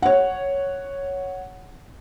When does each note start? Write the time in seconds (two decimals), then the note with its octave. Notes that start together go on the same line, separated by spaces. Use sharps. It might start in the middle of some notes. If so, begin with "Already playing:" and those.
0.02 C#5 F#5